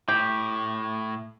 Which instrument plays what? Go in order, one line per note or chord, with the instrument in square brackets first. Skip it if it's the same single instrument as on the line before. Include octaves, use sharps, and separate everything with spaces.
[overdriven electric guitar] A2 [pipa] G4